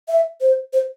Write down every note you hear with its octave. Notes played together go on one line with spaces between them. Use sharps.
E5
C5
C5